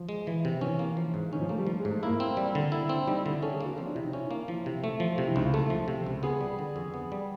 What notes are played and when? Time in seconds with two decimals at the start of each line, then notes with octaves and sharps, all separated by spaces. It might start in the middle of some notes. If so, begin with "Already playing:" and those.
Already playing: F3
0.09 G#3
0.27 E3
0.45 C3
0.61 E3 C#4
0.79 A#3
0.97 F3
1.14 G#2
1.33 D#3 C#4
1.41 F3
1.49 A3 A#3
1.58 G3
1.67 F3
1.79 G#3
1.85 G#2
1.91 A3
2.03 A#3 E4
2.20 C4
2.37 G3
2.55 D3
2.72 E4
2.89 C4
3.07 G3 D#4
3.24 D3 E4
3.43 C#4 A4
3.54 G#4
3.61 A#3 F#4
3.77 F3 C4
3.86 D4
3.95 C3 E4
4.04 D#4
4.13 C#4 E4
4.31 A#3
4.48 F3 E4
4.66 C3
4.84 A3
5.00 F3
5.18 C3 F4
5.27 E4
5.36 C#2 D#4
5.44 F4
5.53 A3 A4
5.70 F3
5.88 C3
6.06 C#2
6.23 B3 G#4
6.41 G3
6.59 D3
6.76 F2
6.94 B3
7.12 G3